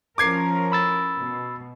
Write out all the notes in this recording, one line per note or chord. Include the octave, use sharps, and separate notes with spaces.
F3 C#4 A#4 D6 G#6 C7
B5 E6 A6
B2